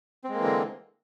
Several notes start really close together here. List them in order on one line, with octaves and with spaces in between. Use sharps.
C4 G#3 A#3 E3 D3